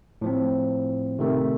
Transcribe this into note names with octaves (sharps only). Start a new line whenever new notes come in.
A2 F3 C4
C3 D#3 A3